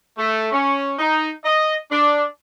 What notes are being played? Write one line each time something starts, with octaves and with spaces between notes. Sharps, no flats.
A3
C#4
D#4
D#5
D4